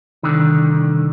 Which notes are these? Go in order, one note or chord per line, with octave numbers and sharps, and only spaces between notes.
C2 A2 D3 D#3